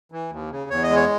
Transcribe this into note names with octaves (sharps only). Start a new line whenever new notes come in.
E3
D#2
C#3
E2 C#5
D#5
G#3
C#5